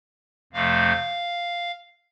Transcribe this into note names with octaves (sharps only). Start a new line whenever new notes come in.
F2 C3 F3 A3 F5